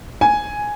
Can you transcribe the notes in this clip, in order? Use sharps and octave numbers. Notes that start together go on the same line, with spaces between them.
G#5